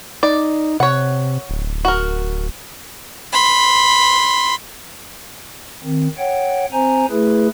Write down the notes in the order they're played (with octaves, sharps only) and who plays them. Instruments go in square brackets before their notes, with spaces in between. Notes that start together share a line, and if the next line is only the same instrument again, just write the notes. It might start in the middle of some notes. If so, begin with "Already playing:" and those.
[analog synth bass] D#4 [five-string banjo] D5
[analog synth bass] C3 [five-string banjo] C#5 F#5
[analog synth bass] D1
[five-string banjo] F#4 A#4
[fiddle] B5 C6
[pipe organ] D#3 C4
C#5 F#5 G5
C4 C5 G#5 A#5
A3 E4 G#4 B4